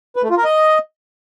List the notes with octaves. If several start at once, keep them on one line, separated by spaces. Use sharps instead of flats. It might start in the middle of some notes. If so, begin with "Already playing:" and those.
B4
A3
F4
A#4
D#5